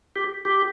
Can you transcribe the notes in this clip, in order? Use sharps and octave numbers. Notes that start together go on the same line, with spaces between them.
G4
G4